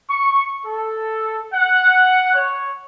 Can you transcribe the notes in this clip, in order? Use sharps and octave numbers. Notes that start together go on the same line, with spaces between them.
C#6
A4
F#5
C#5